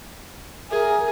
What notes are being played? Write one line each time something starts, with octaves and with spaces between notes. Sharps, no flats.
G#4 A#4 E5 G#5